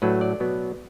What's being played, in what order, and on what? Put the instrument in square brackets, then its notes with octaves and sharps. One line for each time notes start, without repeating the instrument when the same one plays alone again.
[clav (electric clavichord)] A2 F#3 A3 D4 B4
D5
B2 F#3 B3